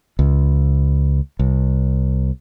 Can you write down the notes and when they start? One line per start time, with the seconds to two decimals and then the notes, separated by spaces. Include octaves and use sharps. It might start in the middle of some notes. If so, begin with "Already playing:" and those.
0.19 C#2
1.39 C2